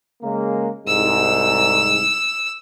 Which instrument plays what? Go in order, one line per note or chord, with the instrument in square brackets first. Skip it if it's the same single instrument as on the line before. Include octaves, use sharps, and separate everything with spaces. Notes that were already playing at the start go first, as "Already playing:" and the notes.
[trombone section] C#3 G#3 A#3
[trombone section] C2 G#2 [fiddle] E6